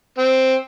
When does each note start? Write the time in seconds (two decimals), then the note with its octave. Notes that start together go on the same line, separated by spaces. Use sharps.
0.18 C4